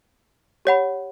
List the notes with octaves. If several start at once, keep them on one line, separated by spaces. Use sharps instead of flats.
G4 C#5 F#5 B5